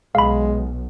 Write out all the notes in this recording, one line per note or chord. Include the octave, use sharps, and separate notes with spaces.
B1 G#3 F5 B5